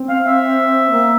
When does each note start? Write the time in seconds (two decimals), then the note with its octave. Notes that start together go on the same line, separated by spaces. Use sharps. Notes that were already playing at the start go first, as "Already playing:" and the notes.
Already playing: C4
0.09 F5
0.26 E5
0.90 A#3